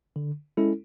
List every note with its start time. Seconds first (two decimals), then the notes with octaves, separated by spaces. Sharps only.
0.16 D3
0.57 G#3 C#4 E4 A4